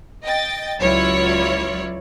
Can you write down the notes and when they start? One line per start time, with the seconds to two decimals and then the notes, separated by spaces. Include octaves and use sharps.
0.24 D#5 G5 A6
0.79 C#2 F#3 E4 F4 C#5 D5